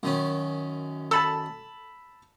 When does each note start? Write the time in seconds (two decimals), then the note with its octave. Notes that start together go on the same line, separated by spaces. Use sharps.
0.03 F#2 D#3 C#4
1.11 A4 A5 B5 E6